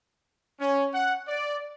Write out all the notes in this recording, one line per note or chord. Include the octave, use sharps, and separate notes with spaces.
C#4
F#5
D5